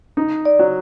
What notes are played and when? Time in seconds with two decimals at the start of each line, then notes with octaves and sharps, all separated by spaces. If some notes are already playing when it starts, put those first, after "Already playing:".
0.17 D#4
0.45 D5
0.59 F#3